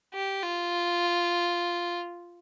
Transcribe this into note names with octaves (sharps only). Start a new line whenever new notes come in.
G4
F4